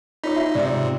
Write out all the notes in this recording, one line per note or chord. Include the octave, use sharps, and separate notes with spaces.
D#4 F4 C#5 D#6
F4 F#4 E5
G#2 C3 D5 D#6